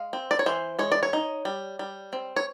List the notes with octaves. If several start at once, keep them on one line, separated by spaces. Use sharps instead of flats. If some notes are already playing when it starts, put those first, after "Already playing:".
Already playing: G#3 F5
C4
D5
C#5
E3 C5
G#3 C#5
D5
C#5
D#4
G3
G3
C4
C#5